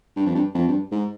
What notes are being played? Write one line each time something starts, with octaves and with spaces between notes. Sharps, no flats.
G2
F2
G2
F2
G2
G#2